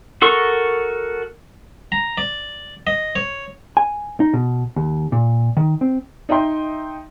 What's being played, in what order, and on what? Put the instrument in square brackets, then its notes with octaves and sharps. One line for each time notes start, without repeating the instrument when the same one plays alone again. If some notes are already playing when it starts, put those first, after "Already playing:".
[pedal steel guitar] F#4 A4 A#4 C#6
[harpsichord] A#5
D5
D#5
C#5
[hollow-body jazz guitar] G#5
D#4
B2
D#2
A#2
D#3
C4
[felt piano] D#4 D#5 E5 G5 C6